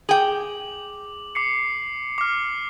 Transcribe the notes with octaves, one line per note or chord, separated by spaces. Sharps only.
G#4 G5 D6 F#7
D6 C7 C#7
D6 F6